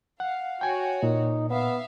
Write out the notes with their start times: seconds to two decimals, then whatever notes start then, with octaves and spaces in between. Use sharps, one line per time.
0.20 F5 F#5
0.61 F#4 C#5 G5 G#5
1.03 A#2 D#4
1.50 B3 E5 F5